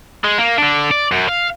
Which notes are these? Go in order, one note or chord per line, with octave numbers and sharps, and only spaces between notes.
G#3
A#3
D3 D4
D5
F#2
F5